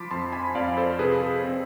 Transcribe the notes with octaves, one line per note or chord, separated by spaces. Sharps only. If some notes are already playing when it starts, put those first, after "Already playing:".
Already playing: F3 A5 B5 C6 D6
F2 A5 C6
G#5 B5
F2 D5 F5
A4 C5
C3 G#4 B4
G#4
C4